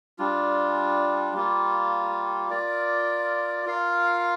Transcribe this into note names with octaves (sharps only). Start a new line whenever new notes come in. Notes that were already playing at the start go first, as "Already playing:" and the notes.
G3 D4 F4
G3 A#3 F4
F4 A#4 D5
F4 A#4 F5